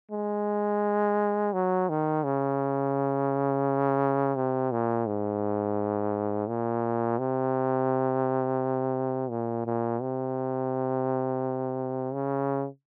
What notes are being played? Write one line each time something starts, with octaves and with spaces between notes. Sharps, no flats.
G#3
F#3
D#3
C#3
C3
A#2
G#2
A#2
C3
A#2
A#2
C3
C#3